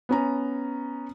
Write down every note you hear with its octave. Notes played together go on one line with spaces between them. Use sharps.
B3 C#4 A#5